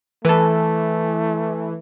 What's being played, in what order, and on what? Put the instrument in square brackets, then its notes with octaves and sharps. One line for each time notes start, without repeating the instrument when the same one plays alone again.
[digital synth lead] E3 [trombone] A3 [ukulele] A4 B4